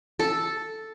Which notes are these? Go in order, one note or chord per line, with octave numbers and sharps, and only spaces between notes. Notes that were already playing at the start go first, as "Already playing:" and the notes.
A4